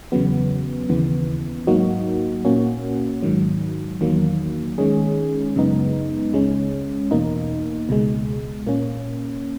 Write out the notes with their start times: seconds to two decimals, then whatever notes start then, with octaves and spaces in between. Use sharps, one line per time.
0.12 E2 C#3 F#3 B3
0.89 D#2 C#3 E3 B3
1.67 G#2 F#3 A#3 D#4 F#4
2.45 A#2 A#3 C#4 F#4
3.23 G#2 D#3 F#3
4.00 E2 D#3 F#3 A#3
4.78 D#3 G#3 C#4 G#4
5.56 F#2 C#3 G#3 B3 D#4
6.33 C#2 C#3 G#3 C#4
7.11 E2 B2 A#3 D#4
7.89 C#2 B2 G#3
8.67 A#2 A#3 C#4